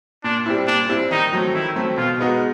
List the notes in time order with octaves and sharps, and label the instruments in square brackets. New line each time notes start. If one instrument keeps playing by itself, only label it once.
[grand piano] A#2 [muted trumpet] D4
[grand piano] G3 C4 E4
[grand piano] A#2 [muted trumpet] D4
[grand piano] G3 C4 E4
[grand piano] D#3 [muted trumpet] D#4
[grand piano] F#3 A3 C4
[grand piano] D#3 [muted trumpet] E4
[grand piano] F#3 A3 C4
[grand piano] B2 [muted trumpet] F4
[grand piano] G#3 B3 D#4 F#4